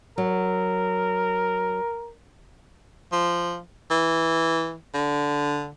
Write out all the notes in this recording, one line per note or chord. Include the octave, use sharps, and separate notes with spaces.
F#3 A#4
F3
E3
D3